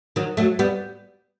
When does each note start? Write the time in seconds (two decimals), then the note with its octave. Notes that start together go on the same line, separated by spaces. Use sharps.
0.16 D#3 F#3
0.37 F#3 A3
0.59 G3 B3